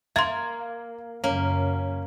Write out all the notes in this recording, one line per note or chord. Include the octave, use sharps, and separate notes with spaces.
A#3 E5 C6 G#6
F#2 C#3 F#3 A#3 C#4